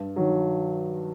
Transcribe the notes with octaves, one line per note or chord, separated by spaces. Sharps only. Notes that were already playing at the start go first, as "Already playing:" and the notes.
Already playing: G2
D#3 F#3